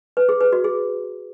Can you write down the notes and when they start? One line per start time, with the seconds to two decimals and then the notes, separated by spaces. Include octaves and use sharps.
0.17 B4
0.29 G#4
0.41 B4
0.52 F#4
0.64 G#4